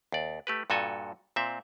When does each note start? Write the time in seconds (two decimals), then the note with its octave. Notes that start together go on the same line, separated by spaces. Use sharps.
0.12 D#2 D5
0.47 A3 G4 B4
0.70 G2 A#2 F#4 A4 G#5
1.36 A#2 C4 E5